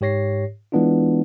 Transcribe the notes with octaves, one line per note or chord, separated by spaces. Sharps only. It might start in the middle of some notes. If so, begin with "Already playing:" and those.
G#2 G4 C#5 A#6 C7
E3 G#3 B3 D4 E4 F4